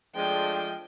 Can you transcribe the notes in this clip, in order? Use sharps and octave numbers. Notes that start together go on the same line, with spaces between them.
F3 G#3 A3 D4 G5